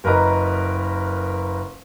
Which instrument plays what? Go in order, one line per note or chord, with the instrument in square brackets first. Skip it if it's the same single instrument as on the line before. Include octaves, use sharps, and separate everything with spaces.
[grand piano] F#1 A#4 B4 D#5 A#5